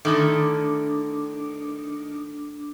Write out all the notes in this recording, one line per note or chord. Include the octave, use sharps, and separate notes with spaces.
D3 D#3 A3 D4 E4 A4 D6